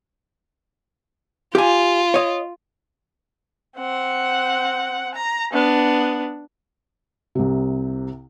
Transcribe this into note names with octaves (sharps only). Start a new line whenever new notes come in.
F4 G4 G#5
C#5 D#5
C4 F#5
A#5
B3 D4
C2 C3